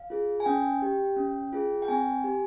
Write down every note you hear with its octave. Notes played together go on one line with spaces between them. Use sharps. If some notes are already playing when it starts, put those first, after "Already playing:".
Already playing: F5
F4 G#4
G#5
C#4 G5
G4
C#4
F4 G#4
G5
C4 G#5
G4